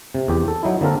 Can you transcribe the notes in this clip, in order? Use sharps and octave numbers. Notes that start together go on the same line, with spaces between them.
C3
E2 G4
A4
F#3 D#4 E4
D3 A#3 C4 A4 A#4